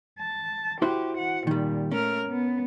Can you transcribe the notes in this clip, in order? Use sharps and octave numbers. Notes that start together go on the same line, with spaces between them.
A5
E4 F#4 G4 C5
F#5
A#2 D#3 G3
A3 C#4 A#4 F6
B3